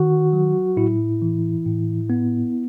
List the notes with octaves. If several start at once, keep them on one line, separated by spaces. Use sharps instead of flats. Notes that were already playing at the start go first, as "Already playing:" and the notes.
Already playing: D#3 F#4
F#3
A2 E4
E3
A2
B3